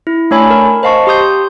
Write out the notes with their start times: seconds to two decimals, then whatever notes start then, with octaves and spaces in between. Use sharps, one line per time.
0.07 E4
0.31 A3 D4 C#5 G#5 B5
0.50 A#4
0.83 C5 D#5 F5 A5 C#6
1.07 G4 C6 D#6 G6